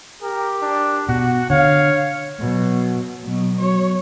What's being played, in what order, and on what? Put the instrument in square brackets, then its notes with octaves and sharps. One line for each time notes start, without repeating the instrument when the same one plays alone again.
[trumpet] G4 [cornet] A#4
[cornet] D4
[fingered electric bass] B2 [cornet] F#4
[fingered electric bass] D3 [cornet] C#5 [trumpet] F5
[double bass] B2 F#3
[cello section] B2 F#3
[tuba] F#3 [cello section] C#5